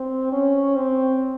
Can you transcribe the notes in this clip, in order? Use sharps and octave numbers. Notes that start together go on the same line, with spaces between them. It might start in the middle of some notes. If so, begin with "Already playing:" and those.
Already playing: C4
C#4
C4